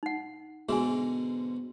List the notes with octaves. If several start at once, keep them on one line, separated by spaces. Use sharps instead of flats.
D#4 F#5
G#2 B2 D3 G#4 G#5